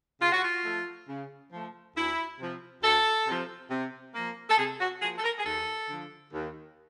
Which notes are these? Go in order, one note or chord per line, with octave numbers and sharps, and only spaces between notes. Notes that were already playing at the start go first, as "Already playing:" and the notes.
C#3 F4
F#4
F4
F3 A3
C#3
F3 A3
D2 E4
C3 F3
D2 A4
C3 F3
C3
F3 A#3
A4
C3 G#4
F#4
F3 A#3 G#4
A4
A#4
G#4
D#2 A4
D3 F3
D#2